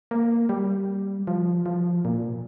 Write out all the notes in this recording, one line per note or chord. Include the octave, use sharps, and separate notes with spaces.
A#3
G3
F3
F3
A#2